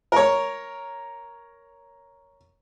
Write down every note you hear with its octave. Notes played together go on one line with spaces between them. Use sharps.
A#4 C#5